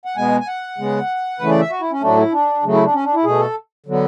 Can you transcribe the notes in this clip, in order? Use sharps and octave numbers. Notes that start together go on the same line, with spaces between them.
F#5
B2 G#3 B3 G#5
G#5
F#5
C#3 G#3 B3
C#3 E3 A3 B4
D5
E5
F#4
E4
C#4
A2 F#3 A3 D4
E4
D4
C#3 F#3 A3
E4
D4
C#4
D4
E4
B2 A3 G#4
A4
D3 F#3 B3